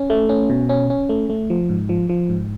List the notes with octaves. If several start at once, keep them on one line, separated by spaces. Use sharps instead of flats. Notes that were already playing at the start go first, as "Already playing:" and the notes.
Already playing: C#4
A3
C#4
B2
C#4
C#4
A3
A3
F3
G#2
F3
F3
G#2